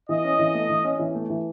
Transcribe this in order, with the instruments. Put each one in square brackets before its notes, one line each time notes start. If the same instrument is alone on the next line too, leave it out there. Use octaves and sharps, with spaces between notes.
[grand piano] E3 [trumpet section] D#5
[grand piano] C#4
E3
A3
E3
C#4
E3
A3
E3